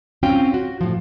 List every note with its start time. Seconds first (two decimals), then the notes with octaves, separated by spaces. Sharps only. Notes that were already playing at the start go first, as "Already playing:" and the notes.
0.23 C4 C#4 F4 F#4 G5
0.54 F#4
0.81 A2 F3